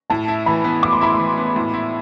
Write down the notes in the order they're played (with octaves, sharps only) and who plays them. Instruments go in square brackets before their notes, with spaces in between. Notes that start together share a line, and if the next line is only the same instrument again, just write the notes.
[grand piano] A2 [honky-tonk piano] A5
[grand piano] E4
[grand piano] E3 [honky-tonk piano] B5
[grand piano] B3
[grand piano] A2 [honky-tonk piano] D6
[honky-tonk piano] C6
[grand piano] E4 [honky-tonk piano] B5
[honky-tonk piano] C6
[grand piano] E3
B3
A2
E4